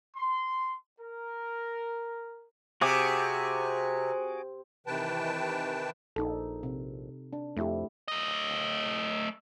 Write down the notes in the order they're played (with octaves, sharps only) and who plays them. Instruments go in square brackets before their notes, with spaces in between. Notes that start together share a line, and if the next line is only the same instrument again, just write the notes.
[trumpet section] C6
A#4
[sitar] C3 [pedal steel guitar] F#4 G#4 D6
[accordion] C3 D#3 E3 B4 G5 A5
[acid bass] A#1 [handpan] D#4 A4
[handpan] C3
D4
[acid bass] F2 [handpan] A3 E4 G4
[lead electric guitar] A3 D#5